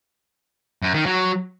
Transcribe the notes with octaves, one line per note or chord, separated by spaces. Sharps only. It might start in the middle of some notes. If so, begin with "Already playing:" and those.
F#2
D#3
F#3